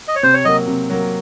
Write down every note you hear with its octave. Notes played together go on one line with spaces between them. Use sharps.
D#5
C#5
C3 C5
C#5
F#3 A#3 D#5
C3
F#3 A#3